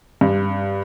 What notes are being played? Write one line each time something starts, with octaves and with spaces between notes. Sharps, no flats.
G2